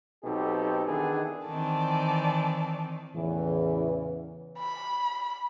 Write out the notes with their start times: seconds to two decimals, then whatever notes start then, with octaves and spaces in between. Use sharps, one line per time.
0.25 B1 B2 C4 D#4 G4 A4
0.86 D#3 E3 B3 D4 G#4 A4
1.46 D#3 E3 C4 D5 A5
3.15 E2 A2 C#3 E3
4.59 B5